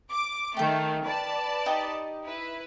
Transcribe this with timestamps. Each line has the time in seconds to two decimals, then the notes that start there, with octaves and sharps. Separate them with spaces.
0.11 D6
0.57 D#3 A3 G5 G6
1.05 B4 D5 A5
1.66 D#4 G4 D#5
2.24 E4 B4